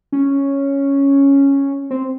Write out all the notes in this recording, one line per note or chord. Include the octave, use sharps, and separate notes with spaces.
C#4
C4